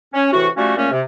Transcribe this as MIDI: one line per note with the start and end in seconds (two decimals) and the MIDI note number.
0.13 0.28 61
0.33 0.48 45
0.33 0.48 48
0.33 0.48 52
0.33 0.48 66
0.56 0.77 53
0.56 0.77 55
0.56 0.77 57
0.56 0.77 61
0.56 0.77 66
0.77 0.89 46
0.77 0.89 49
0.77 0.89 57
0.77 0.89 58
0.77 0.89 61
0.91 1.01 48